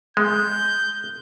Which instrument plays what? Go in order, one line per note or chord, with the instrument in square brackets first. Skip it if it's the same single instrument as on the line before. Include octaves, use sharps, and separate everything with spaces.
[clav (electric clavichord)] G#3 [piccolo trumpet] G6